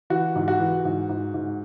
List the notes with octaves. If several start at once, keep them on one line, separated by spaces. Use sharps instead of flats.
E3 F#4
G#2
F#4
E3
G#2
G#2
G#2